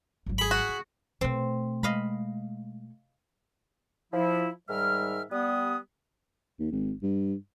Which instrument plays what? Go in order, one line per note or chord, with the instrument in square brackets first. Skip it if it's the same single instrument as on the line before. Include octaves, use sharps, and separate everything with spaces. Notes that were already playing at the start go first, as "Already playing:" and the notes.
[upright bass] G#1 F#3
[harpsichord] G#4 B5
[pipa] F#4
[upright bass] C#3
[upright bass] B2 A3 [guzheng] C4
[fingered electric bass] G#3 [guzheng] D#5 F5 B5
[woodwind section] F3 E4
G#2 D#3 G3 E5 F6
G3 B3 D#6
[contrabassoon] D#2
G#1
G2